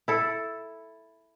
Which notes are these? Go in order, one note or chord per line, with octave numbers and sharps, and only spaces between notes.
E4 A4